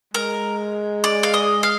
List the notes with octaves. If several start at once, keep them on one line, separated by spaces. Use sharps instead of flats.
G#3 A#4
D5
F5
D#5
F5